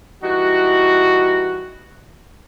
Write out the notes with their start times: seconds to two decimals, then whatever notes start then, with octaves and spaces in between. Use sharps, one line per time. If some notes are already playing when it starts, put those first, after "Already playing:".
0.23 E3 G3 D#4 F#4